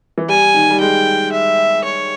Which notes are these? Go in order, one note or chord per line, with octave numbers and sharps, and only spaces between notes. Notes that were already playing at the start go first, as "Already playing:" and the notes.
E3
G3 G#5
D#3
G3
G#3 G5
E5
C#5